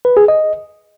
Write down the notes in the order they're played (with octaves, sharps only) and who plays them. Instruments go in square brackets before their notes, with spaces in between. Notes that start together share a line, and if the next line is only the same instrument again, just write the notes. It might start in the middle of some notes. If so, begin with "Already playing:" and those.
[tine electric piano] B4
G#4
D#5